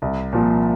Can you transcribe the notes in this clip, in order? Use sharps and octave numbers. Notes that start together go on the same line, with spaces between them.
C2
A#2 F3